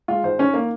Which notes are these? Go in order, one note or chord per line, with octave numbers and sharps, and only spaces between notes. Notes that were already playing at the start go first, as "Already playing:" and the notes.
G#3 F4
G#1 C5
D#3 C#4
A#3